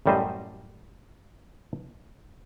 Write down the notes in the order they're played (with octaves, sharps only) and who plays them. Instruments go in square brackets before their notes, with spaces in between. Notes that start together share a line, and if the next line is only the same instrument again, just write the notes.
[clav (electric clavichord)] A1 F#2 G3 A3 C5 D#5